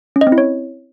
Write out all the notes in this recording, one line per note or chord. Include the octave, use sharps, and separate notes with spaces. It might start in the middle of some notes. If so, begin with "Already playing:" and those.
C#4
D#5
C4
E4
C#5